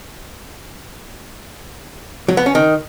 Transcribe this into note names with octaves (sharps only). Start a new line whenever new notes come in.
F#3
B3
C#4
D#3